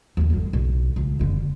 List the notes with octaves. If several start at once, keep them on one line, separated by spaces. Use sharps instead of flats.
D#2 D#3
G1 F#3
B1
C#2
F#1 D3